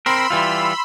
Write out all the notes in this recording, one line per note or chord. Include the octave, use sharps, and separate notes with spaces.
C4 A#4 B5 C6 E6
E3 G3 F4